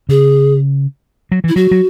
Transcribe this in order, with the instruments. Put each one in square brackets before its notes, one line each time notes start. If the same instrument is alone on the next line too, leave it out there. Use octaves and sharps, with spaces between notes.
[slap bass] C#3 [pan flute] G#4
[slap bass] F#3
[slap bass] E3 [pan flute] E4
[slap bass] F#3 [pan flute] F#4
[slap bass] F#3